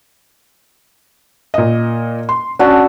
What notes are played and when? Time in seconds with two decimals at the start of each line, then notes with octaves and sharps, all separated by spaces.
1.54 A#2 D#5
2.29 C6
2.59 C#4 D4 F#4 E6